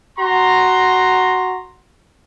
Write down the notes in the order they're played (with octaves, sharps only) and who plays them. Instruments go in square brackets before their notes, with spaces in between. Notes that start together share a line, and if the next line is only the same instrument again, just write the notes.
[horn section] F#4 A#5 C6